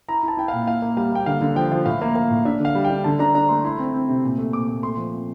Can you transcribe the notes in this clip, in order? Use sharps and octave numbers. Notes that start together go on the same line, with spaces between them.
E4 A#5
E4
A5
E4 G5
F5
A#2
E4 F5
A#3
G3 F5
A#3 G5
D3 F5
D3
F3 G5
F3
A2 F5
A#3
A#3
A2
D4 E5
D3 F5
G3
G5
D4
D3 A5
D4 A#5
D4 A#5
A3 C6
E4 C6
C4
C4
C3
A#2
A3
A#2 D6
A#2
A3 C6
F3
C4